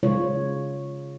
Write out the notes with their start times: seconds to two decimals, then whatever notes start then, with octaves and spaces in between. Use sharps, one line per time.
0.03 C#3 G#3 F4 C#5